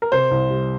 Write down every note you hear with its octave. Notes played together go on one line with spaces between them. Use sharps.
A#4
C3 C5
C2
G3